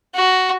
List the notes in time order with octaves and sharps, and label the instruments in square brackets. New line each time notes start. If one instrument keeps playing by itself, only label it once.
[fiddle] F#4